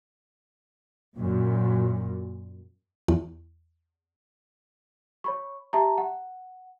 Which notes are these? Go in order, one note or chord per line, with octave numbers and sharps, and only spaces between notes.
F#2 A#2
E2
C#5 B5 C#6
G4 E5 A5 A#5
F#5